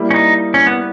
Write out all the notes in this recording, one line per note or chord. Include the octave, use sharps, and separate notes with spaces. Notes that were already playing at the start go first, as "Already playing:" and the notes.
Already playing: G3 A#3 E4
C#4
D#4
C#4
B3